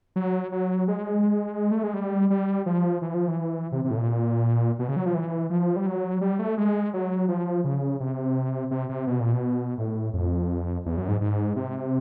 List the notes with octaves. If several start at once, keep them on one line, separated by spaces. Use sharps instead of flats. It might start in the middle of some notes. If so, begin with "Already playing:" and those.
F#3
F#3
G#3
A3
G#3
G3
G3
F3
E3
F3
E3
C3
C3
A2
A#2
B2
C#3
F#3
F3
E3
F3
G3
F#3
G3
A3
G#3
F#3
F3
C#3
C3
C3
C3
B2
A#2
B2
A2
F2
E2
F#2
G#2
G#2
C3